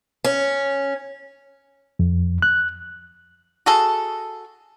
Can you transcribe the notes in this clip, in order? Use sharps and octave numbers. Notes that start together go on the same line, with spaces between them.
C#4
F2
F#6
F#4 G#4 A4